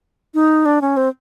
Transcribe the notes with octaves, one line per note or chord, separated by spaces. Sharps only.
D#4
D4
C#4
C4